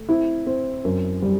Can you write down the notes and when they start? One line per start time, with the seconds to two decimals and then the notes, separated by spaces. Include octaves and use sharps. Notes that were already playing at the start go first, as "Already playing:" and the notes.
Already playing: A3
0.09 C4 E4
0.47 C4
0.85 F#2
1.22 G3